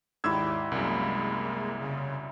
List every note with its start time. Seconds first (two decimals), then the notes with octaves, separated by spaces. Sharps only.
0.24 D#2 G#2 E4 G4 D5 E6 G#6
0.72 C2 F#2 G#3 A#3
1.80 C#3